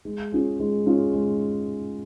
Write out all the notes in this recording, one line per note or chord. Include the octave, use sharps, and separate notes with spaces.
G#3
C#4 F4 G#4
G#3
C#4 F4 G#4
G#3